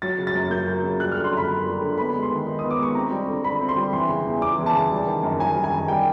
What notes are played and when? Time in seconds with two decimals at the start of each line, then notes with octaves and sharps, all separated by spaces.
0.02 F#3 A6
0.18 C#3
0.27 A6
0.35 F#2
0.51 A#3 G6
0.67 F#3
0.83 C#3
1.00 G3 F#6
1.12 F6
1.17 D3
1.24 C6
1.32 F#2 B5
1.49 A#3
1.65 G3
1.82 D3
1.98 B3 B5
2.14 G#3
2.23 C6
2.31 D#3
2.47 D#4
2.59 B3 D#6
2.71 D6
2.79 G#3 C#6
2.95 C4 A#5
3.11 G3
3.28 D3
3.44 D3 B5
3.61 C4
3.69 C6
3.76 G3
3.93 E3 C6
4.09 C#3
4.26 E2
4.41 E2 D6
4.59 E3
4.66 A5
4.75 C#3
4.91 G3
5.07 D#3
5.23 F#2
5.39 F#2 G#5
5.56 G3
5.64 G#5
5.72 D#3
5.88 G3 G5